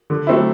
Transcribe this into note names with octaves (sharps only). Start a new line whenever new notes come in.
D3
F#3 A3 C4 E4